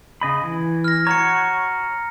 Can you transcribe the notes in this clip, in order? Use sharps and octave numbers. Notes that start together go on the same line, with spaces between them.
C#3 D#5 B5
E3
F6 A#6
F#4 C#5 A#5 C#7